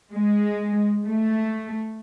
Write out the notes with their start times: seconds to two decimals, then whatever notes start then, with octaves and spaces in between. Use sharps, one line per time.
0.14 G#3
1.07 A3